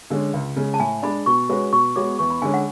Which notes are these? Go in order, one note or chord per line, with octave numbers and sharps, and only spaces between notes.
D3 G#3 C#4
C#2
C#3 G#3
A5
A2 G#5
G#3 D4 B5
B2 C#6
G#3 C#4 F#4 B4
B2 C#6
G#3 B3 F#4 C#5 D6
E2 C#6
B5
D3 G#3 C#4 G#5
F#5